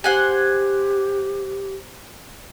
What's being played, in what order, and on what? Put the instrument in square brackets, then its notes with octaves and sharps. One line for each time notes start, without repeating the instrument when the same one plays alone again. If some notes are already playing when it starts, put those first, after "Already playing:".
[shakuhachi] G4 [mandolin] C5 F#5 G#5